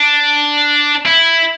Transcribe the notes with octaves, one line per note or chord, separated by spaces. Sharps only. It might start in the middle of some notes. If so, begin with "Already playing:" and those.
Already playing: D4
E4